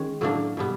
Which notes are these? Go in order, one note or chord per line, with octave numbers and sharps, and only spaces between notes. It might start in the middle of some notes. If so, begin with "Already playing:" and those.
Already playing: D#3 G#3 C#4
A2 F#3 A#3 D4
B2 G3 B3